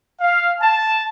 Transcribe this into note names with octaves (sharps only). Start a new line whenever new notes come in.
F5
A5